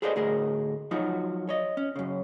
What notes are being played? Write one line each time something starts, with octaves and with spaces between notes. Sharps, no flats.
G#4 A4 B4 C5 D5 D#5
D2 A2 G#4 A#4 D#5
F3 F#3 D#4 F4 F#4
C#5 D#5
C#4
F#2 C#3